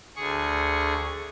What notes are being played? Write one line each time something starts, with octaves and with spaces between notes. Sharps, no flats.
D2 G#4 C#6